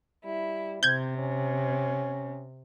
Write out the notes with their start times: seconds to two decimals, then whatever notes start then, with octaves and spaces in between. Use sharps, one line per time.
0.25 G3 E4
0.83 C3 C4 G6 G#6
1.18 C#4